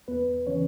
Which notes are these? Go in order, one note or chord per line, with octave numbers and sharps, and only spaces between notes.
E2 B3 B4
C#3 E3 C#4 C#5